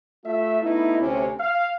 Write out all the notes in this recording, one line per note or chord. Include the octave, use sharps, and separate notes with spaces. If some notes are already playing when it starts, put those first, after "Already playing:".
A3 F4 E5
A3 B3 D#4 E4
D2 C3 C#4
F5